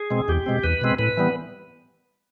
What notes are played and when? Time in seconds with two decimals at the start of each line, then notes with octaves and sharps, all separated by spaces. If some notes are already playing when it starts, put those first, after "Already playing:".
Already playing: G#4
0.10 B2 G#3 C4
0.28 E2 G4
0.46 B2 G#3 C4
0.64 E2 B4
0.81 B2 G#3 C4
0.99 A2 B4
1.17 E3 G3 B3